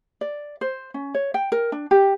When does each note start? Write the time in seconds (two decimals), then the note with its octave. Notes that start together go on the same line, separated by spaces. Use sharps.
0.21 D5
0.61 C5
0.94 C#4
1.14 C#5
1.34 G5
1.52 A#4
1.72 D4
1.91 G4